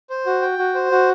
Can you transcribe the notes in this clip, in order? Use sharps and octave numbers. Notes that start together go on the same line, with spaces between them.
C5
F#4
G5
F#4
C5
F#4